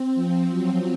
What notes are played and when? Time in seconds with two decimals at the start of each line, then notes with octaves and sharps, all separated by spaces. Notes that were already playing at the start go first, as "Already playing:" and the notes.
Already playing: C4
0.15 F3
0.50 F#3